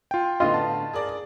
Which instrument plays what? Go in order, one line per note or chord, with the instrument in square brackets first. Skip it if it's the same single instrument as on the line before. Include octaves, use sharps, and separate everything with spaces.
[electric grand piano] F4 G5
[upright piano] A2 D3 B3 [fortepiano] F4 [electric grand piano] D#5
[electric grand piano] A5
[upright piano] G#4 A#4 D5